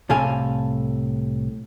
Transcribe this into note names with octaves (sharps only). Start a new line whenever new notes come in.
C2 A2 C3 A4 F5 G#5